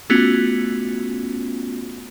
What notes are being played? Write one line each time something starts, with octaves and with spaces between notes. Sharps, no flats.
A3 B3 C#4 F4 F#4